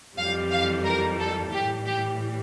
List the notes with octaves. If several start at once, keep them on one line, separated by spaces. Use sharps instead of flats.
F2 E3 G3 F5
F5
A#4
A4
A2 E3 G3 G4
G4